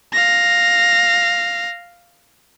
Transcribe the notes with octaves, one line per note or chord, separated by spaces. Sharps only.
F5 A#6